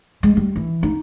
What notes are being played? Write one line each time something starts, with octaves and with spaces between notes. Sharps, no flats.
G#3
G3
E3
D#4